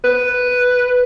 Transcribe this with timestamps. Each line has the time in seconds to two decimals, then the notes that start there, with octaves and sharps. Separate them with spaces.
0.04 B4